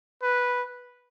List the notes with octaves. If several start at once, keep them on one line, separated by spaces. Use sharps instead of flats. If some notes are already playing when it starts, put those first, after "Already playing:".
B4